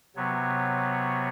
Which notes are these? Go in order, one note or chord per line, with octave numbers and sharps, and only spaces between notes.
C3 F#3 B3 C#5